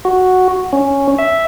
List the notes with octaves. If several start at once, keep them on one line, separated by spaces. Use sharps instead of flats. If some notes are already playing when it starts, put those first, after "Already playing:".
F#4
C#4
E5